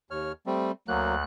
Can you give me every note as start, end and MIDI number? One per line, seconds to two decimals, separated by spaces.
0.11 0.32 39
0.11 0.32 73
0.11 0.32 89
0.46 0.72 55
0.46 0.72 57
0.46 0.72 60
0.88 1.23 38
0.88 1.15 54
0.88 1.15 58
0.88 1.23 90